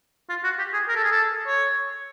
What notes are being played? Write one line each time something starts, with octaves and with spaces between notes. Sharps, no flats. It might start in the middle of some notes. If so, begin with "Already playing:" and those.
F4
F#4
G4
G#4
A#4
A4
G#4
A4
C#5